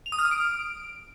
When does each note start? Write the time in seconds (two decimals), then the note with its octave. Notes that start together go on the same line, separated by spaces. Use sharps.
0.06 F7
0.12 D#6
0.19 F6
0.25 D#6
0.31 D7